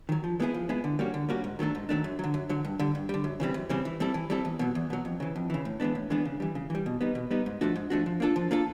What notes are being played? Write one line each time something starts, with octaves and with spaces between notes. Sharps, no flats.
D#3 F#3
F3
G#3 B3 E4 G#4
F3
G#3 B3 E4 G#4
D3
G3 A#3 C#4 F#4
D3
G3 A#3 C#4 F#4
G#2
D#3 F#3 A3 D4
G#2
D#3 F#3 A3 D4
F#2
D3 F#3
F#2
D3 F#3
G2
D3 G3
G2
D3 G3
F#2
C#3 E3 G3 C4
F#2
C#3 E3 G3 C4
E3
G3 C4 E4 A4
E3
G3 C4 E4 A4
E2
B2 F#3
E2
B2 F#3
F2
C#3 E3
F2
C#3 E3
A2
E3 G#3 B3 D4
A2
E3 G#3 B3 D4
C#3
E3 G3
C#3
E3 G3
B2
G3 B3 D#4
B2
G3 B3 D#4
G#2
F3 A3 D4 F#4
G#2
F3 A3 D4 F#4
F3
A#3 D4 F4 A4
F3
A#3 D4 F4 A4